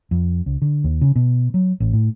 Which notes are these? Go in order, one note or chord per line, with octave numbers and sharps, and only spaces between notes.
F2
C#2
D3
D#2
C#3
B2
F#3
A1
A2